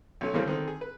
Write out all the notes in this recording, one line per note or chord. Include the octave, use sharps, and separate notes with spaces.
B1 A3 C#4
E2 A2 C#3 G3 A#3 C4
D3 D#3 C4
G#4
B4